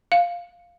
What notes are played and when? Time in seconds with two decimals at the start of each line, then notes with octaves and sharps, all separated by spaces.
0.12 F5